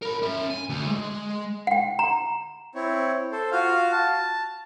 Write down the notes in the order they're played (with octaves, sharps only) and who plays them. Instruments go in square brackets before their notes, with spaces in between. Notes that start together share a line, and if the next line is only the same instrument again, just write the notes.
[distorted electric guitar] A#4 B5
C#4 E5
G#5
D2
G#3
[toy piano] F#5 G5
A#5
[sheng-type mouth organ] C4 E4 C#5
A4 C5
F4 F#4 F5
A5